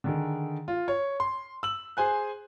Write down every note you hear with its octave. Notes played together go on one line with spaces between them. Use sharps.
D3 D#3 G#4
F4
C#5
C6
E6 F#7
G#4 C5 G#5 F#6